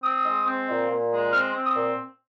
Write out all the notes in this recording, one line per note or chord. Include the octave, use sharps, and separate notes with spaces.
C4 D#6
G#3
C4
A#2
A#2
G#3
C4 F6
C4
D#6
A#2